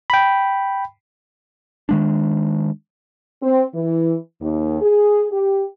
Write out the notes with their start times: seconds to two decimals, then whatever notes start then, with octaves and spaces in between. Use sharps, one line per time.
0.10 G5 B5
1.89 D#3 G#3 D4
3.42 C4
3.74 E3
4.41 D#2
4.81 G#4
5.32 G4